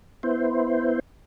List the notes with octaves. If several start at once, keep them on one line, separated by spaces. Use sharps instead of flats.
B3 E4 C5